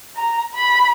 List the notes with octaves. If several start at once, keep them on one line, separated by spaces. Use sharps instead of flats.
A#5
B5